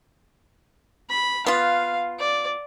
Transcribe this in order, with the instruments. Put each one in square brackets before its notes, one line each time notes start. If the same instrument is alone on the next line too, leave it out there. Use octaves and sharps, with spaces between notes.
[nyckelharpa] B5
[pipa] B3 F4 [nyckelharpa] F5
[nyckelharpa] D5